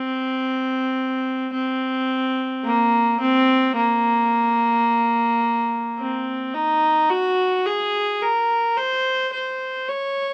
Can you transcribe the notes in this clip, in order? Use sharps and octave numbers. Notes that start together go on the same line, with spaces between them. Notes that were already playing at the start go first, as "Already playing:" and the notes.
Already playing: C4
C4
A#3
C4
A#3
C4
D#4
F#4
G#4
A#4
C5
C5
C#5